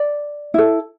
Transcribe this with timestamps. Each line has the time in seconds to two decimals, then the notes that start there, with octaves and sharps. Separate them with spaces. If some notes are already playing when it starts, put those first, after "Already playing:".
Already playing: D5
0.54 E4 A4